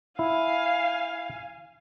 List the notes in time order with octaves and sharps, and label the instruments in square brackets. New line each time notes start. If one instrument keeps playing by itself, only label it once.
[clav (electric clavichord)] E4 [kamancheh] F5 G#5